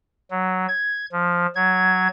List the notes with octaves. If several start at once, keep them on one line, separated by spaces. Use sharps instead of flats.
F#3
G#6
F3
F#3 G#6